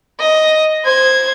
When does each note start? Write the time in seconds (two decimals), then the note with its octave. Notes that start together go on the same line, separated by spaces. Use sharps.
0.20 D#5
0.85 C5 G#6